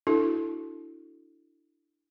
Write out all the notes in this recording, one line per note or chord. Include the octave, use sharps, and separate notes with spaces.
D4 E4 F#4 A4